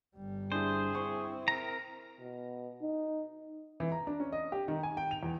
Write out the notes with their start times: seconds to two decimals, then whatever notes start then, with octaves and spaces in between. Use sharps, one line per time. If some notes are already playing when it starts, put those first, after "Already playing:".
0.16 G1 G3
0.52 D4 E4 G#4 C5
0.95 C4 E4 C#6
1.48 A#4 A#5
2.20 B2
2.82 D#4
3.80 E3
3.92 A#5
4.07 D4
4.20 C#4
4.32 D#5
4.52 G4
4.68 D#3
4.83 G#5
4.97 G5
5.11 F7
5.23 E2